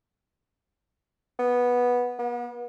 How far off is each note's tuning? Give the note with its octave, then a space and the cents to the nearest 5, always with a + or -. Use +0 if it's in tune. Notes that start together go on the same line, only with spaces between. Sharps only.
B3 -10
B3 -40